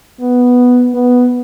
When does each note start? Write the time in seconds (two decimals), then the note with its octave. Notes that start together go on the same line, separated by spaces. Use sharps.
0.21 B3
0.94 B3